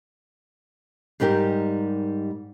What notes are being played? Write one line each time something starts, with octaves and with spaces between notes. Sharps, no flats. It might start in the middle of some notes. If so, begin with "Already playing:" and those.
G#2 G3 D#4 G4 A#4